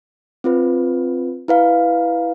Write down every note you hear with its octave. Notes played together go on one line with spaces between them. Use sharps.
C4 F4 B4
E4 B4 F5